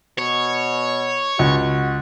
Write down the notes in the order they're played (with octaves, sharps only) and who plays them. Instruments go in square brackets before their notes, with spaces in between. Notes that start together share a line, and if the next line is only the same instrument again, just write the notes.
[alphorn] B2 [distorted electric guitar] C#5
[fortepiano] C#2 [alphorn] F#4